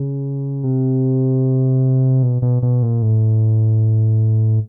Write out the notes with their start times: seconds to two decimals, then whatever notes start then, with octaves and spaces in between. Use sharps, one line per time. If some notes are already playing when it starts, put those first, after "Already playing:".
Already playing: C#3
0.64 C3
2.23 B2
2.42 B2
2.63 B2
2.82 A#2
3.02 A2